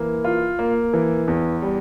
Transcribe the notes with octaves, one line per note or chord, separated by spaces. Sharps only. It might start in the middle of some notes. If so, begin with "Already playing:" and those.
Already playing: E3 A#3
F4
A#3
E3
E2
G3